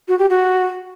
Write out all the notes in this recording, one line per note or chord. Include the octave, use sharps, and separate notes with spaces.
F#4
G4
F#4